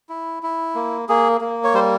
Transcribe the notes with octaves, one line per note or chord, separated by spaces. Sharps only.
E4
E4
A#3
A#3 G#4
A#3
C#5
G3 C5